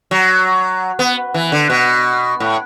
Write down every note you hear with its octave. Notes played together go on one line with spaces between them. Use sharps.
F#3
B3
E3
D3
B2
A2